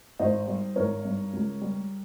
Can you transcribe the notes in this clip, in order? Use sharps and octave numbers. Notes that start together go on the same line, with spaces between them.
G#1 C5 D#5
G3
G#1 A#4 C#5
G2
C#2
G3